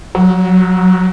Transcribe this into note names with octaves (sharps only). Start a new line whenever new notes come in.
F#3